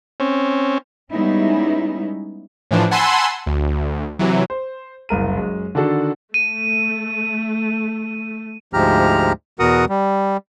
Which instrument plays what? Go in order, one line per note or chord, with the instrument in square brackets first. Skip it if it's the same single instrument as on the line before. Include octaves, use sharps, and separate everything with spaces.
[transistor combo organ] C4 C#4
[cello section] G3 G#3 B3 C#4 D#4 E4
[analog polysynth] A2 E3 F3 D4
F#5 G#5 A5 B5 C6 E6
D2
C3 E3 F#3
[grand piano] C5
F#1 C2 A#4 D#7
F#2 G#3
D3 D#3 D4 F#4 A4
[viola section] A3 [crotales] D#7
[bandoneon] D2 G#2 F3 G4 A#5 F6
E2 B2 F#4 A#4 F#5 D#6
G3